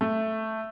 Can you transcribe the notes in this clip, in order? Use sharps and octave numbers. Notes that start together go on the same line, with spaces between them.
A3